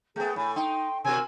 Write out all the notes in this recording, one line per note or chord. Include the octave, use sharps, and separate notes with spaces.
A3 B3 G#4 G5 G6
A2 G#5 B5
D#4 G5 C6
B2 F#4 A#4 G#5 C6 E6